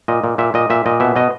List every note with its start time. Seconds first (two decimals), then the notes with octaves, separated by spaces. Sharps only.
0.08 A#2 D#5
0.24 A#2
0.38 A#2 E5
0.54 A#2 D#5
0.70 A#2 E5
0.86 A#2 D#5
1.00 B2 E5
1.16 B2 D#5